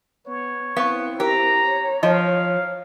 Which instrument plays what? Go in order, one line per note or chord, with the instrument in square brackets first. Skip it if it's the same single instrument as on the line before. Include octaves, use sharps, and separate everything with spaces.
[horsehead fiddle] B3 [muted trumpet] C#5
[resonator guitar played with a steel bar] B3 [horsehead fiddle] C4 E4 [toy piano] F5 C#6
[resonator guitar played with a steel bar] G4 [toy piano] A#4 C5 [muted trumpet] A#5
[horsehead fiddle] C#5
[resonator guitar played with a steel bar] F3 [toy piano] D#5 [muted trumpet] F5